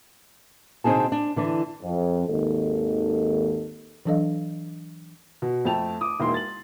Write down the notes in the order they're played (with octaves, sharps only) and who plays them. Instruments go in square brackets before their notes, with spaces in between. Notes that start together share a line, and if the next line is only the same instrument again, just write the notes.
[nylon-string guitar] B2 D3 C4 D#4 G#4 A5
D4
D3 E3 D4
[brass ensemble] F2
G#1 D#2 A4
[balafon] E3 F#3 D4 A4 D#5 F5
[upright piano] B2
F2 A3 G5 A5 F7
D6 D#6
E1 A#3 D#4 E4 C6
A6 F#7